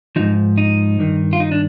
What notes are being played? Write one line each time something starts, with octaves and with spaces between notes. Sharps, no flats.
G#2 F3 D#4
D#4
G2 D#3
F4
D#4
D4